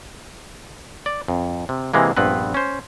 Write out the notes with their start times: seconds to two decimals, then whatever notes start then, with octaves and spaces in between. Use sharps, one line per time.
1.06 D5
1.28 F2
1.69 C3
1.94 C3 E3 G#3 A#3
2.17 A#1 G2 B3 C4 B4
2.54 C#4 C5